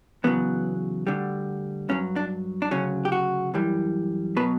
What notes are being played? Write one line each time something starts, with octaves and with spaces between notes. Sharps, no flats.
E2 C#3 F#3 B3
D2 D3 G3
G2 F#3 C#4
D4
D4
D2 C#3 F#3 C#4
G4
F#4
F#2 E3 G3
B2 F#3 B4